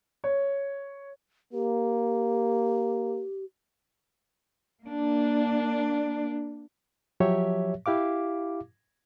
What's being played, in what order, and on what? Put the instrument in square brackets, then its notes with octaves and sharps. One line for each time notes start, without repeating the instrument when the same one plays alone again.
[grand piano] C#5
[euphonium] A#3 [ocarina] G4
[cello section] A#3 D4
[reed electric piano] F3 F#3 G4 C#5 E5
E4 G4 F5 D6